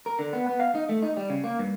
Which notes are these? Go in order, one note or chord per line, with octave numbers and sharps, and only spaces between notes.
A#4
D3
B3
B3
F5
D#4
A3
D#4
G3
C#3
A#3
G2